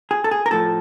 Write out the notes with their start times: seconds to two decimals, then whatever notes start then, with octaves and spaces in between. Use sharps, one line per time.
0.11 G#4
0.24 A4
0.31 G#4
0.46 A#4
0.51 A2 F3 A4